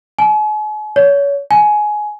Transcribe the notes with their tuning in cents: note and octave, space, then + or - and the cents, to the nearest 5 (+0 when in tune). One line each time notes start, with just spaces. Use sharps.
G#5 +40
C#5 +30
G#5 +15